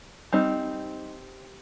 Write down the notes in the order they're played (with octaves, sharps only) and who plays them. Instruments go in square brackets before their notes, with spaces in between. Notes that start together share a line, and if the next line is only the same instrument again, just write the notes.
[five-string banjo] G3 C4 D#4